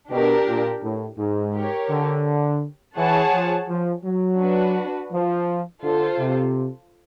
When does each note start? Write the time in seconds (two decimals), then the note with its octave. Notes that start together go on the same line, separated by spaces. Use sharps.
0.11 B2 D4 G4 A#4
0.47 A#2
0.83 A2
1.18 G#2
1.54 G4 A#4 C#5
1.91 D3
2.97 E3 G#4 C#5 F#5 A5
3.33 F3
3.69 F3
4.05 F#3
4.41 D4 F#4 B4
5.12 F3
5.83 D3 F4 A4 C5
6.19 C3